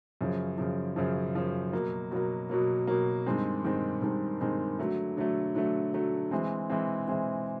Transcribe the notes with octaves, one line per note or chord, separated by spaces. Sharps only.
F#2 C#3 F3
F#2 C#3 F3
F#2 C#3 F3
F#2 C#3 F3
B2 F#3 A#3
B2 F#3 A#3
B2 F#3 A#3
B2 F#3 A#3
G2 D#3 G#3 C4
G2 D#3 G#3 C4
G2 D#3 G#3 C4
G2 D#3 G#3 C4
D3 F#3 A3
D3 F#3 A3
D3 F#3 A3
D3 F#3 A3
E3 G#3 C4
E3 G#3 C4
E3 G#3 C4